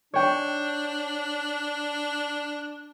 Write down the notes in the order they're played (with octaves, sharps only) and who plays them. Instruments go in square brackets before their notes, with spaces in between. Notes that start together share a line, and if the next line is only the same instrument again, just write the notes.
[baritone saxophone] D4 [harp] C#5 G5